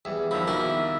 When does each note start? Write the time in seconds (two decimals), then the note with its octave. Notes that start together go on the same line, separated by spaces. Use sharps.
0.05 E2 G3 G#4 E5
0.31 E2 D#3 F3 E5 B5
0.47 B2 D#3 G3 A#3 E4